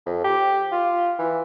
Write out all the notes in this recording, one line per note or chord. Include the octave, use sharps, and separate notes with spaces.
F2
G4
F4
E3